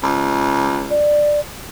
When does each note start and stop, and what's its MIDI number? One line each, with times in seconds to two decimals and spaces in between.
0.02 1.08 37
0.90 1.40 74